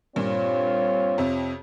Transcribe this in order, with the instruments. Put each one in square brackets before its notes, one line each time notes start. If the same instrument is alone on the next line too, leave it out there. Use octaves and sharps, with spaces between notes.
[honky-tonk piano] G2 A#2 [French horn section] C4 F4 C#5
[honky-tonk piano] F2 C3